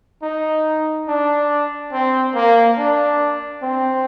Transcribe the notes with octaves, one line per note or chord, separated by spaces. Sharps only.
D#4
D4
C4
A#3
D4
C4